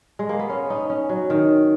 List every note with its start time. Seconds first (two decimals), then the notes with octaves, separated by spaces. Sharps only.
0.19 G#3
0.29 A#3
0.39 B3
0.49 C#4
0.70 D#4
0.90 C#4
1.09 F#3
1.30 D#3